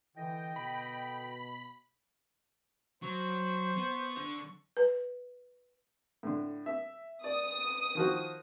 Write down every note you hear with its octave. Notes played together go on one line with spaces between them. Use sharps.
D3 E3 D#5 G5
B2 B5
F#3 C5 C#6
B3
D3
B4
A2 D3
E5
D5 D#6
D#3 F3 F#4